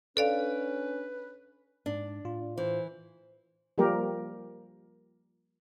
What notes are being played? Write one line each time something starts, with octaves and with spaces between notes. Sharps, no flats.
C#4 D4 A4 B4 D5 F5
G#2 D4
A2 F4
E3 C5
F3 G3 A#3 G4 A#4